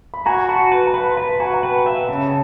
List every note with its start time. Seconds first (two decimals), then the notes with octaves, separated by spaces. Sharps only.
0.14 B5
0.26 F#4 G#5 A#5
0.48 F#4 A5 B5
0.72 B4
0.87 A#5
0.94 B4 A5 B5
1.11 C6
1.17 B4 A5 B5
1.29 B5
1.40 F#4 G#5 A#5
1.54 A#5
1.62 B4 G5 A5
1.85 E5 F5 G5
2.08 C#3 A5 B5
2.27 A5